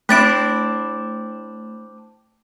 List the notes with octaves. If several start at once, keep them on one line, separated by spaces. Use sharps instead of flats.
A3 C4 D4 E4 A6 D7